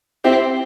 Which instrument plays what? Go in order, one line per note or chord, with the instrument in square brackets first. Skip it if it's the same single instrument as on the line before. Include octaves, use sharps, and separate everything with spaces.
[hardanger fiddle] C4 [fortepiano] E4 G4